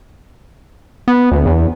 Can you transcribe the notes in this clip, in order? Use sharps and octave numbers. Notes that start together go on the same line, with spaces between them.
B3
D2
E2